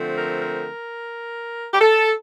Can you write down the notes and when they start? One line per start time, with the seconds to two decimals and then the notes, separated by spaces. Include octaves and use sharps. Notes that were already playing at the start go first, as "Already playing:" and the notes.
Already playing: D3 F3 A3 C4
0.17 A#4
0.40 A#4
1.74 G4
1.80 A4